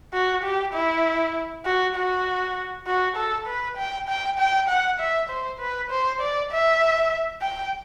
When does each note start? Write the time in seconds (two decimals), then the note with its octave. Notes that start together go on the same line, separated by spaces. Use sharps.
0.13 F#4
0.43 G4
0.74 E4
1.65 F#4
1.96 F#4
2.87 F#4
3.16 A4
3.47 B4
3.77 G5
4.08 G5
4.39 G5
4.69 F#5
5.00 E5
5.30 C5
5.60 B4
5.91 C5
6.21 D5
6.52 E5
7.42 G5